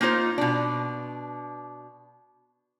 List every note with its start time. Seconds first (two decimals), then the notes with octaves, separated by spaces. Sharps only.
0.01 A#3 D#4 F4 C5
0.38 B2 D4